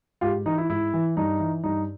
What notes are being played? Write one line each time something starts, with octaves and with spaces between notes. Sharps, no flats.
G#2 F4 G4
E3 D#4
E4
G#2 E4
E3
G2 D#4
E3
G2 D#4